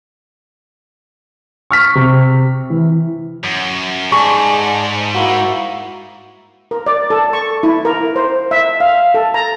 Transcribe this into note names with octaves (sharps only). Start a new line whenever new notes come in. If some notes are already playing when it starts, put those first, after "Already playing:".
C#6 F6 B6
C3
E3
F#2
G#2 G#4 D5 A5 C#6
A#3 E4 F#4
A#4
D5
A4
C#6
E4
A#4
C5
E5
F5
A4
A#5